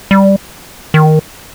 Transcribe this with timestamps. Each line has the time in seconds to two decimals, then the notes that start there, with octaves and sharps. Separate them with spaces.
0.11 G3
0.94 D#3